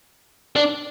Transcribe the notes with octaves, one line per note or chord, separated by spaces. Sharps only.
D4